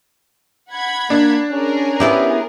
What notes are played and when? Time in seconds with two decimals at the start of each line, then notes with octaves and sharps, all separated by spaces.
0.70 F#5 B5 G#6
1.10 A#3 D4
1.51 C#4 G#4 A#4
2.00 B3 E4 G4